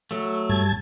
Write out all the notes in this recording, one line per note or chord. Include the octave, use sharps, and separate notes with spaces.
F#3 A3
G2 A5 G#6